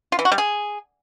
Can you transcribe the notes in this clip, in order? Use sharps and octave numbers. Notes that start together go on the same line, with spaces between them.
F4
E3
F#4
G3
G#4